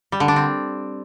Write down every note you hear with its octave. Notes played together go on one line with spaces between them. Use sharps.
G3
D3
D4
C4